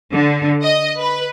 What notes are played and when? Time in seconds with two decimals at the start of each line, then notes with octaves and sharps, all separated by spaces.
0.13 D3
0.64 D#5
0.99 B4